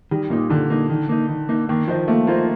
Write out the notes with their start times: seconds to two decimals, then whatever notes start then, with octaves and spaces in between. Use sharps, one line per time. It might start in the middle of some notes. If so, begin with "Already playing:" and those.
0.11 D#3 G3
0.30 A#2 A#3 D#4
0.50 D3 D#3
0.70 A#3 D#4
0.90 D#3
1.09 A#3 D#4
1.29 D#3
1.49 A#3 D#4
1.69 D#3 A#3
1.88 F3 F4 C5 D#5
2.08 A3 A#3
2.27 A#3 F4 C5 D#5